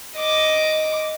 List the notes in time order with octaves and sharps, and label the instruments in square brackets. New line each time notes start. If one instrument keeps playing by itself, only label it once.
[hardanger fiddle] D#5 D6